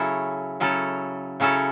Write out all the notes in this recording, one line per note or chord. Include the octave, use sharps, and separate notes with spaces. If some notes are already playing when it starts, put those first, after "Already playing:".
Already playing: C#3 F#3 C#4 E4 A4
C#3 F#3 C#4 E4 A4
C#3 F#3 C#4 E4 A4